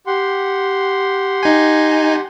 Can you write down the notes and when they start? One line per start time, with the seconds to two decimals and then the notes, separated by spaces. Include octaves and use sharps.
0.07 G4 F#5 C6
1.43 D#4 G#5